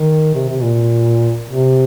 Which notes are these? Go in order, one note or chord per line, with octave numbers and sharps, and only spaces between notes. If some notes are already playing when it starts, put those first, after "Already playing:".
Already playing: D#3
C3
C3
A#2
C3